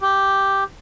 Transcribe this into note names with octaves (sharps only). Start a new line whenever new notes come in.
G4